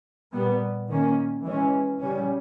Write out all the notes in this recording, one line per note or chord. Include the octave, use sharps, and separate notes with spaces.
A#2 G3 B3
D#3 A#3 C#4
E3 G#3 C#4
C#3 G3 C#4